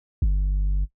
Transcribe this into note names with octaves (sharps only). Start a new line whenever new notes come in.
G1